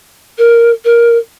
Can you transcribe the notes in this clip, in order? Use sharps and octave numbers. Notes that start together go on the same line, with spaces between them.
A#4
A#4